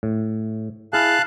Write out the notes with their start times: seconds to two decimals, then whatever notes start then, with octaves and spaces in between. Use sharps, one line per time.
0.03 A2
0.93 E4 G#4 F5 A5 F#6